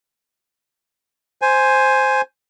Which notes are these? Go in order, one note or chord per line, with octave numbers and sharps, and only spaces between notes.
C5 G#5